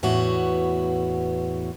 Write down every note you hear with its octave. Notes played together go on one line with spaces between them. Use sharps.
E2 A2 B3 F#4